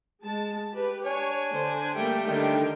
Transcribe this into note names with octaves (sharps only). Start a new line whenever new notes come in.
G#3 A5
G4 B4
D4 C#5 G#5
D3 C5
G3 A3 A#3 G5
D3 D#3 G5